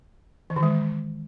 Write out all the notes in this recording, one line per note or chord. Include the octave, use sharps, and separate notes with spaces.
E3
D#3
G#3